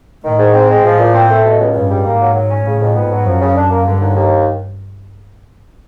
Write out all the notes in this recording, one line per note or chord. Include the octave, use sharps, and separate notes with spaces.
A2 D#3
G#2
C4
G#3
A2 F3
A#2
C4
A3
B2
C#2
C#2 G2
G3
G#2 A#3
F#3
F#3
C#4
A2 C#3
F2
G#2 B3
F#3
F#2 F3
C#3
D4
A#3
G2 D3
D#2
D#2